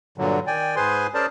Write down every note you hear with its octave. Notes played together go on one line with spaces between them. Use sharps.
G2 A#2 D3 F#3
D#3 D5 G5 G#5
G#2 G#4 B4 C5 G#5 C6
C#4 G#4 A#4 C5 D5 A5